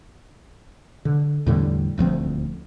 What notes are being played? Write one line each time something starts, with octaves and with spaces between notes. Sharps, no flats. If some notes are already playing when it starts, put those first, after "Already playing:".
D3
E2 A2 D3 G3
D#1 D2 F3 C4